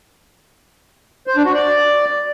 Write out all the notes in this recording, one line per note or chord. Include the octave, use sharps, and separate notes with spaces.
C5
D4
F#4
D5